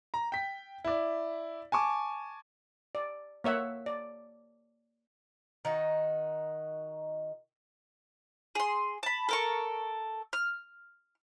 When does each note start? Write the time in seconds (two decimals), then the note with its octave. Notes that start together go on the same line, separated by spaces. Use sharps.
0.14 A#5
0.32 G5 B6
0.85 E4 D5
1.72 G#5 A5 C#6 D6
2.95 D5
3.44 A#3 C#5 E5 F#5
3.86 D5
5.65 D#3 D#4 F#4
8.55 G#4 C6
9.03 A5 B5
9.29 A4 A#4 C#6
10.33 F6